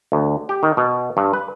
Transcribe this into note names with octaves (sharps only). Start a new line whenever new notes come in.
D2
G4
D#3
B2
G2
B4